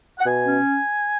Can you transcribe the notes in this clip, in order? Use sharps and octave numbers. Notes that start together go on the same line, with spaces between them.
F#5
B2 G#5
C#4